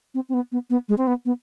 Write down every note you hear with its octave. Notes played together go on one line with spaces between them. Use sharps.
C4
C4
B3
B3
B3
G#3
C4
B3
B3